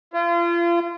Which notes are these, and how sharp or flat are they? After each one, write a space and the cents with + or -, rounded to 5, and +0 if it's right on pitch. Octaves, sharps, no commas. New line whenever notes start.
F4 -35